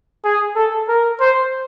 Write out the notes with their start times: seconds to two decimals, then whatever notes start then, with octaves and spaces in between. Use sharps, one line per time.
0.24 G#4
0.56 A4
0.88 A#4
1.20 C5